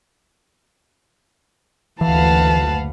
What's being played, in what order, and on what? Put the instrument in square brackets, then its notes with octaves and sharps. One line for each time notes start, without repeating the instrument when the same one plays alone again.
[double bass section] F#1 D2 [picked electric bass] E3 [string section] B4 F5 F#5 [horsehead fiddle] A5